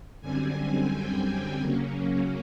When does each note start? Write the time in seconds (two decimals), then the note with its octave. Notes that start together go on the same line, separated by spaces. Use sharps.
0.21 F#2 D3 G3 C4 G#5
0.91 G5
1.60 C#3 F#3 A#3 C#4